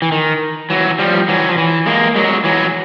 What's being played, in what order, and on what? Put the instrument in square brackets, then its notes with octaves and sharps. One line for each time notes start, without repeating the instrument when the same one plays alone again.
[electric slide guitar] E3
D#3
E3 F#3
F3 G3
E3 F#3
F3
E3
G#3 A#3
F#3 G#3
E3 F#3